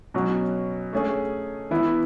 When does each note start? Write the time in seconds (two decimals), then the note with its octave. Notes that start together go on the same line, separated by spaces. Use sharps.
0.14 B2 F#3 C#4 F#4
0.93 A3 C#4 G#4
1.71 E3 B3 E4